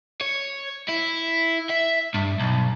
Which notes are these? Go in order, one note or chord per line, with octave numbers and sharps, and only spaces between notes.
C#5
E4
E5
G2
B1